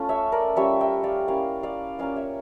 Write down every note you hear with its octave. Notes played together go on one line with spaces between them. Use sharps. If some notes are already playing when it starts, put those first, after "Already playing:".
Already playing: A3 C#4 F4
C#5 E5
A#4 D5
G3 C#4 F4 C#5 E5
E5 G5
D5 F5
A#3 C#4 E4 D5 F5
D5 F5
A#3 C#4 F4 D5 F5
C#5 E5